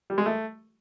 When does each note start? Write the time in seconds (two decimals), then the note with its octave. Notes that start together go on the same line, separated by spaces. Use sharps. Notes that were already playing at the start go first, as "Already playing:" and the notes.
0.10 G3
0.18 G#3
0.26 A3